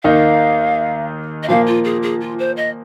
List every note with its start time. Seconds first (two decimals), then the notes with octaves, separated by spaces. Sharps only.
0.04 D#2 D#3 A#3 D#4 F5
1.43 D#5
1.48 A#2 F3 A#3 F5
1.66 F4
1.84 G#4
2.02 G#4
2.21 F4
2.39 C5
2.56 D#5